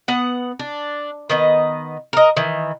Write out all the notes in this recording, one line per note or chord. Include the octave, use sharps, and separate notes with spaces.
B3 F#5
D4
D#3 B3 D#5
A#4 D#5
D#3 E3